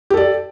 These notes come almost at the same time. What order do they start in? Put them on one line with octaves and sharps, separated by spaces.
G4 A4 D5